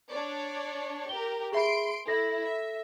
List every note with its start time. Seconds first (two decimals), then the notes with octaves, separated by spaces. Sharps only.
0.10 D4 C#5 D5
1.09 G4 A#4 G7
1.52 G#4 E5 B5 C6 D7
2.07 E4 A4 A#6
2.43 E5